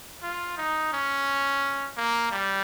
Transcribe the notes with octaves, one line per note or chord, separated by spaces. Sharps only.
F4
D#4
C#4
A#3
G3